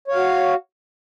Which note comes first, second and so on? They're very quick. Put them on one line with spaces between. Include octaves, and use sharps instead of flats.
C#5 F5 F#4